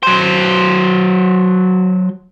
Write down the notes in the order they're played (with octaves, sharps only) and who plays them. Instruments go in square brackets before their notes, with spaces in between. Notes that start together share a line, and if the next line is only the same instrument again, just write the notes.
[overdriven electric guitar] F#3 C5